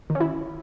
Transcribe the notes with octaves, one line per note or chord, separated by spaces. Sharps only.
D#3
C#4
E4